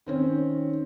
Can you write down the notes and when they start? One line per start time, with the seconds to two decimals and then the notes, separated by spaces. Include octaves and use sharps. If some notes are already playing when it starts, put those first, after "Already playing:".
0.06 D#3 C4 C#4